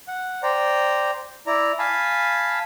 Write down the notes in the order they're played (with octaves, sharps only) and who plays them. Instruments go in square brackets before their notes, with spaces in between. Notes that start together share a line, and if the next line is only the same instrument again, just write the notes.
[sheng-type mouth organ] F#5
C5 D5 G5 A#5
E4 D5 A#5
F5 G#5 A5 B5